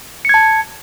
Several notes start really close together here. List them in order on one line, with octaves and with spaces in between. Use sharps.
C#7 G#6 A5